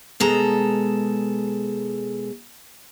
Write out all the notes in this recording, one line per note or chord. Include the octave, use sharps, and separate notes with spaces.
B2 G#3 A4 A#5